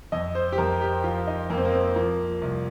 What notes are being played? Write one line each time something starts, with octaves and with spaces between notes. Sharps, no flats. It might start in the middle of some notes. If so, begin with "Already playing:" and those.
F2 D#5
C5
G4
F2 A#4
G4
F3 F4
D#4
F2 A#3
C4
A#3
C4
F3 A#3
C2